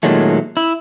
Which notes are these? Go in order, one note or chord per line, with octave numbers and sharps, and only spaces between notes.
A#2 D#3 F#3 G#3 A3
E4